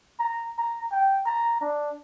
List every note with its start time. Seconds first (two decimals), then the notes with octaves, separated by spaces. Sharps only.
0.20 A#5
0.58 A#5
0.91 G5
1.26 A#5
1.61 D4